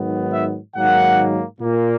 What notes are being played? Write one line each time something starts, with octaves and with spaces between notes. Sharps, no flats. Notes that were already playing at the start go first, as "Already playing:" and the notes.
Already playing: G#2 D#3 F#3 B3
E5
G#2 D#3 F#3 A#3 F#5
A#2 A#3